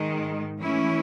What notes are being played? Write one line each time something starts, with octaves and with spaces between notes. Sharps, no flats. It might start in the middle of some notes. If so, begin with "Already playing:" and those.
Already playing: G#2 D#3 G#3
E3 A3 C#4 E4